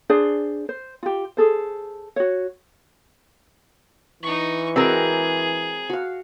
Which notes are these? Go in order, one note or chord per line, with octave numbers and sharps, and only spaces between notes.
D4 G#4 C5 D5
C5
F4 G4
G#4 A4 C5
F#4 C#5
E3 D#4 C#6
G#3 C4 F#4 G#4 A#4
F#4 F5